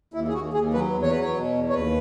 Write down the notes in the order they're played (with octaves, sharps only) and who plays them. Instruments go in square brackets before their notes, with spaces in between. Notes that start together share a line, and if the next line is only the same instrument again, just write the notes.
[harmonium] D#2 E4
G#4
D#2 F#4
D#2 G#4
F#3 B4
E2
C#5
F#3 B4
C#5
B2
E2
C#5
D#2 B4